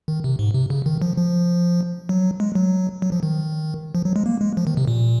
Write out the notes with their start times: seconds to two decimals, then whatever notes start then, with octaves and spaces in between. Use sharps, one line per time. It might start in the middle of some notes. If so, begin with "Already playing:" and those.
0.08 D#3
0.24 C3
0.39 G#2
0.54 C3
0.70 C#3
0.86 D#3
1.02 F3
1.17 F3
2.09 F#3
2.40 G#3
2.55 F#3
3.02 F#3
3.12 F3
3.23 D#3
3.95 F3
4.05 F#3
4.16 G#3
4.26 A#3
4.41 G#3
4.57 F3
4.67 D#3
4.77 C3
4.88 A#2